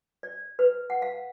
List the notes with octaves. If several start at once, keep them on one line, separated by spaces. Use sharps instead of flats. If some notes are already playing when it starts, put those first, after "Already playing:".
D5
B4
F#5
F5